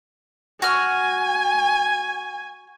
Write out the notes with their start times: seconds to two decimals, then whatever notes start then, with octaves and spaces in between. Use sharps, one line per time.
0.62 F#4 G#5 F6